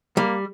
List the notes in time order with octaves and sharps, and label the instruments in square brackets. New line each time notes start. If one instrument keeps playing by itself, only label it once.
[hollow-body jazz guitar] G3 [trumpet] A#3